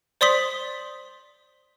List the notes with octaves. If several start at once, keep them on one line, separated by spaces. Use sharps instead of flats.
C5 D5 C6 D#6 B6 F#7